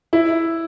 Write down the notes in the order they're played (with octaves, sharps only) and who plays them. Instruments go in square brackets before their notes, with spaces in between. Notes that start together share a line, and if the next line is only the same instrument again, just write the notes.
[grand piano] E4